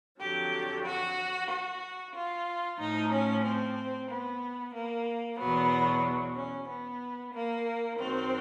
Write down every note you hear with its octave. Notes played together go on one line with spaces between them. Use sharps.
F2 D3 F#3 G4
F#4
F#4
F4
A2 F3 D#4
C#4
C4
B3
A#3
E2 B2 F#3 B3
C#4
B3
A#3
F#2 D#3 F#3 C4